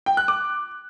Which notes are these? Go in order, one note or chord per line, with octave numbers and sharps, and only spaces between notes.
G5
F#6
D6